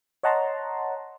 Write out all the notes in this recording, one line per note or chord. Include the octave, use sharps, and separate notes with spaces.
C#5 D#5 F#5 A5 A#5 C6